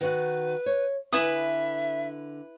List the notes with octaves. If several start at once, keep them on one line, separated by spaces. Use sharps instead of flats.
D#3 F#4 B4 F#5
C#5
D3 E4 B4 E5 G#5 D#6